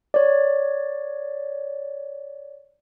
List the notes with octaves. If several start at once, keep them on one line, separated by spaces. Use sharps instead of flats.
C#5 D5